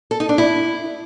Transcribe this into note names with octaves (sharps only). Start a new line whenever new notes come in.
A4
D#4
D4
E4